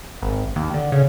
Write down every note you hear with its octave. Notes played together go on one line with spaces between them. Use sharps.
G#1
D#2
D3
C#3